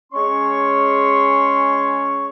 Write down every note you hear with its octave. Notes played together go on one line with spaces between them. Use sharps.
G#3 C#4 C#5 C6 C#6